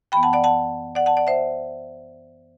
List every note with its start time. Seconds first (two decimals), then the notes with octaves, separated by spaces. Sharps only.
0.12 F#2 E3 B3 G5 B5
0.23 F#5 A5
0.33 D5 F#5
0.44 F#5 A5
0.95 D5 F#5
1.06 F#5 A5
1.17 D5 F#5
1.27 C5 E5